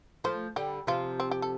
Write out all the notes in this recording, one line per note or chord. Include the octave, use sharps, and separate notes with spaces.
F3 A3 C5
D3 G3 G4
C3 F3 F4
C4
G4
A4